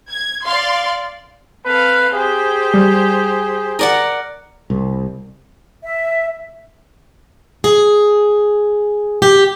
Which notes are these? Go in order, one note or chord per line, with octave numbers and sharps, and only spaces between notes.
G#6
D5 F5 C6
C4 A4 B4 F5
G4 G#4 C5
G3
A#4 D5 F#5
C2
E5
G#4
G4